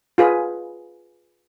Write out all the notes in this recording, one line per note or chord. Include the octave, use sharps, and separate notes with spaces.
F4 G#4 B4